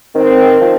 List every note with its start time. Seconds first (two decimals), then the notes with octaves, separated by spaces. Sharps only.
0.15 D#3 C4
0.61 F3